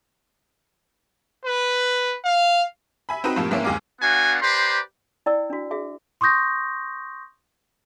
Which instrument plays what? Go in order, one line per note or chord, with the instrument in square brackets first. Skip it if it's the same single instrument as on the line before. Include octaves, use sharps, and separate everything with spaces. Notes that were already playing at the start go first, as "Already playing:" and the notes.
[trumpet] B4
F5
[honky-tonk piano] E5 G#5 B5
C4 D#4 F#4 B4
A2 C3 F3 A#3
G#2 E3 A3 A#3 C4 C#4
G1 D#2 G#3 G#4 F5 D6
[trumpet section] B3 D4 F#4 F5 F#5 G#5
G4 B4 C5 D5 A#5 C6
[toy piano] E4 D5 G5 E6
D4 F#4
F#4 G#4 E5
[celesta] C6 C#6 D#6 G6 A#6